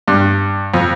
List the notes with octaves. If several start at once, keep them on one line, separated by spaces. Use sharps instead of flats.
G2
F2